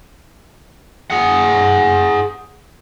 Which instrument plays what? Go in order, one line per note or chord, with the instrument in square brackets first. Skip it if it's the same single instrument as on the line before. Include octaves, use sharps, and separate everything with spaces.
[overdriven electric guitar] G#4 F#5